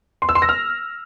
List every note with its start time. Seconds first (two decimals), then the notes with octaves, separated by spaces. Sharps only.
0.22 C6
0.29 E6
0.35 C6
0.42 A#6
0.49 F6